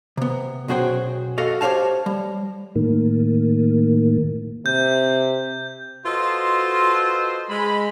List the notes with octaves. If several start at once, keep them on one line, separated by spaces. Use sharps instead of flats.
C3 B3
B1 F#2 F#4 G#4 C5 G5
F#4 A4 D#5 F5
G4 C5 C#5 F5 A5
G3
A2 D#3 A#3
C3 G6
F4 F#4 A4 B4 C5 D#5
G#3 B5